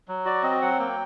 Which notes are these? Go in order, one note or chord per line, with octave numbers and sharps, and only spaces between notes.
F#3
F#4 D5
C4 D#5
F#3 F#5
A#3 G5